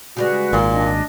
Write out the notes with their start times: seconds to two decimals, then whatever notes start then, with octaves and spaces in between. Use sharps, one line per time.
0.17 C#3 G3 G#3 F#4 B4 F#5
0.53 G#1 A#2 G#3 A#3
0.70 D4 D#5